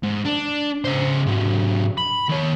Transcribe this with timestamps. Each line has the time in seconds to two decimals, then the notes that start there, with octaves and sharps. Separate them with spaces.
0.03 G#2
0.26 D4
0.84 C#3 C5
1.27 G#2 F#3
1.97 B5
2.29 D#3 C#5